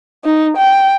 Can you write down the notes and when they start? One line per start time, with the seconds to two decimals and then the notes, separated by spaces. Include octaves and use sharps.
0.25 D#4
0.57 G5